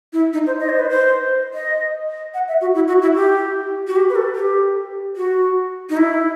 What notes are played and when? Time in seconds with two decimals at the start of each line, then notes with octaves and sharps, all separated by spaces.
0.13 E4
0.33 D#4
0.47 C5
0.60 D#5
0.69 C5
0.79 B4
0.89 C5
1.54 D#5
2.34 F#5
2.48 E5
2.61 F#4
2.75 E4
2.88 F#4
3.02 E4
3.15 G4
3.87 F#4
3.96 G4
4.10 B4
4.15 A4
4.35 G4
5.16 F#4
5.90 D#4
5.97 E4